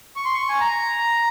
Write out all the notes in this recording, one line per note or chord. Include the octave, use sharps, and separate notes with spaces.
C#6
C6
C#6
G#5
A#5